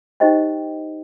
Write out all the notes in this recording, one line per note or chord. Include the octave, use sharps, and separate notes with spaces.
D#4 G4 C5 D#5 G5